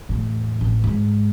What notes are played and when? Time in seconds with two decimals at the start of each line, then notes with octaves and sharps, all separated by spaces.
0.09 E2 A2
0.61 A1
0.84 G#2